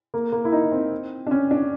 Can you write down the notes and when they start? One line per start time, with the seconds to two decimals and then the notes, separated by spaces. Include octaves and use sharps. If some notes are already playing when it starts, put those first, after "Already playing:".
0.14 A#3
0.32 A#3
0.45 E4
0.52 D#4
0.72 C4
1.27 D4
1.31 C#4
1.51 D4